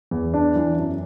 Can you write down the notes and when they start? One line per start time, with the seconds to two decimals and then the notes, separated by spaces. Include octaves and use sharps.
0.11 E2
0.34 D4
0.55 E3
0.77 F#2